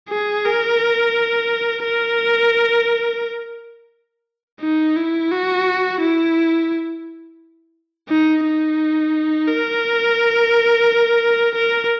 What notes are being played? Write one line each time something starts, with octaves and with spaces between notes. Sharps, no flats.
G#4
A#4
A#4
D#4
E4
F#4
E4
D#4
D#4
A#4
A#4